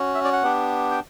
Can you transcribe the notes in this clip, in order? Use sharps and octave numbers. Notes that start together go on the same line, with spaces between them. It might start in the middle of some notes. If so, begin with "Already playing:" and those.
Already playing: C#4 F#4
E5
D5
F#5
B3 D4 G4
G5